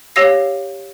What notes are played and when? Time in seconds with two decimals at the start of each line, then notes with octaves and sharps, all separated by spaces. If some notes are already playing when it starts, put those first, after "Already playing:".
0.16 G4 C#5 F5 E6 A#6 C7